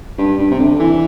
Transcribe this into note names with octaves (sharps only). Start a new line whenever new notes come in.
G2
G2
C3
D3
E3